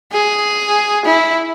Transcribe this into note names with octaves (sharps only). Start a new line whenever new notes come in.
G#4
E4